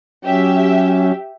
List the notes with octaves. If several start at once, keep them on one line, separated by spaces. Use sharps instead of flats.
F#3 C#4 G4 E5